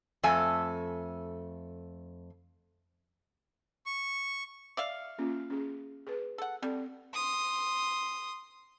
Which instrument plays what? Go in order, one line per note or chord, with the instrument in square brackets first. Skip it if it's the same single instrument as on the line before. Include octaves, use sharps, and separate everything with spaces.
[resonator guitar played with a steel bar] F2 A3 E5 G#5
[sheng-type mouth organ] C#6
[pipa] D5 E5 F5
[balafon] A#3 C#4 F4
C#4 G#4
G#4 B4
[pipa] A4 F#5
[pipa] G3 [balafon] C4 A4
[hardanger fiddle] C6 D#6